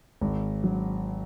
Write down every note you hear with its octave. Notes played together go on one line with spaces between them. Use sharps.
G#1
F#3